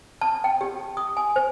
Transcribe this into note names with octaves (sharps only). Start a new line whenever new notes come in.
A5
G5
G4
D#6
G#5
C5